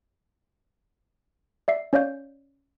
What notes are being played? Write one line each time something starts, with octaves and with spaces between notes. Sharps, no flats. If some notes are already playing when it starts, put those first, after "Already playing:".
D5 E5 C7
C#4 C#5 D5 F5 G6